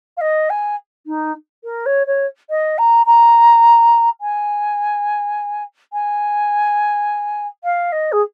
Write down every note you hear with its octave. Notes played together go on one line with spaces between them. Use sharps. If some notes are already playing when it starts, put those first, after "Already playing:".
F5
D#5
G#5
D#4
A#4
C#5
C#5
D#5
A#5
A#5
G#5
G#5
F5
D#5
G#4